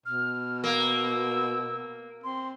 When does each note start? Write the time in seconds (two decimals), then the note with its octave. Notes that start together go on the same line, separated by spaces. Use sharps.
0.06 B2 F6
0.64 A#3 E6
2.24 C4 C6